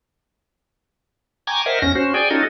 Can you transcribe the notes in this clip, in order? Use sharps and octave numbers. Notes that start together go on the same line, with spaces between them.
G5 G#5 A#5 C#6 D6 G#6
A#4 C5 D#5 E5 F#5 F6
E2 C#4 A#6
C#4 F#4 C5
G#4 D5 G5 G#5
C#4 D#4 F4 F#4 A4 D#5